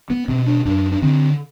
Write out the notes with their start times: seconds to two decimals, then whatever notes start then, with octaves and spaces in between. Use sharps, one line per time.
0.10 B3
0.28 B2 C4
0.46 D4
0.65 F#2 D4
0.92 D4
1.02 D3 C4